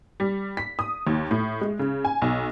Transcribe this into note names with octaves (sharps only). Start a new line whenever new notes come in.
G3
B6
D#6
D#2
A2
G#3
C#3
G#5
B1